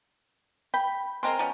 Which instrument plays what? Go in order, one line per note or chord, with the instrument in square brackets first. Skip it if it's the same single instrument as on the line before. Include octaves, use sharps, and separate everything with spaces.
[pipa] G5 [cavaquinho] B5
[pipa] G#3 C4 A#4 [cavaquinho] D#5 A#5 C6
[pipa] F3 B3 C#4